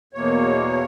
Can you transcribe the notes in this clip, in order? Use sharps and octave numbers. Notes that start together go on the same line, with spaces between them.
E2 B2 A#3 C#5